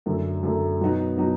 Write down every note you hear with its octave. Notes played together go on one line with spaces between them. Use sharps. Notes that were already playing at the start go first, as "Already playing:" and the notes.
F#2 D3 F#3 A3
F#2 D3 F#3 A3
B2 F#3 B3 D#4 F#4
B2 F#3 B3 D#4 F#4